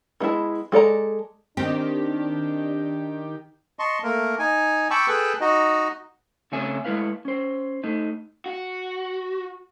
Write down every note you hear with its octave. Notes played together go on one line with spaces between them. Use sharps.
D#3 G#3 B3 E4 A5
G#3 A4 D5 A#5
D#3 C4 D4 G4
D#5 A5 C6 C#6
A3 A#3 A#4
D#4 G#5
G5 A5 B5 C#6 D6 E6
G#4 A4 B4 G5 A5 B5
D#4 F#4 D#5
C#3 A3 C4 C#5 E5 G#5
G#3 A3 E4 B4 F5
C#4 C5
A3 D#4
F#4